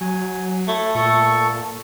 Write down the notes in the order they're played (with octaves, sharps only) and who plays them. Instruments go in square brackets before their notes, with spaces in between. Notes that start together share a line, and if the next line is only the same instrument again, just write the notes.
[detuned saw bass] F#3 [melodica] G#5
[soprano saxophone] A3 [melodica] E4
[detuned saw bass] A#2 [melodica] A4 C#6